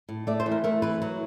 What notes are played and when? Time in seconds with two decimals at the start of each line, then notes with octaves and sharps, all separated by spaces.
0.09 A2
0.27 A3 D5
0.40 C5
0.46 E3
0.51 A#4
0.64 A3 A#4
0.82 E3 B4
1.02 F#3